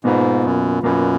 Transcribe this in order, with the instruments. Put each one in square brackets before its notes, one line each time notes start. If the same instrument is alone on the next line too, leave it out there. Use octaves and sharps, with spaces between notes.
[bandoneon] G#2 [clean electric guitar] B2 A#3 F4 B4
[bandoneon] F#2
[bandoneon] F#2 [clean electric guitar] B2 A#3 F4 B4